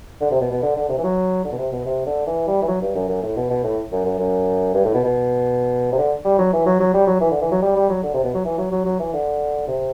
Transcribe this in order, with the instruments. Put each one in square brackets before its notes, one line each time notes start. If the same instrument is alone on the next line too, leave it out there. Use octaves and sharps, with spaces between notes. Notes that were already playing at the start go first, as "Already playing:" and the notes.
[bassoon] D3
C3
B2
B2
D3
D3
C3
E3
F#3
D3
B2
C3
B2
C3
D3
E3
G3
E3
F#3
G2
F#2
F#2
A2
B2
B2
A2
F#2
F#2
F#2
G2
A2
B2
B2
C3
D3
G3
F#3
E3
F#3
F#3
G3
F#3
E3
D3
E3
F#3
G3
G3
F#3
D3
C3
B2
F#3
E3
F#3
F#3
F#3
E3
D3
C3